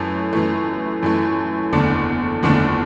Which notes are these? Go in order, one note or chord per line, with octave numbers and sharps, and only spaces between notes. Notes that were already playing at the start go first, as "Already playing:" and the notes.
Already playing: F#2 E3 A3
F#2 E3 A3
F#2 E3 A3
F#1 E2 D3 A3 D4
F#1 E2 D3 A3 D4